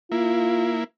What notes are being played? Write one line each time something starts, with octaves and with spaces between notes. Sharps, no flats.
A#3 E4 F4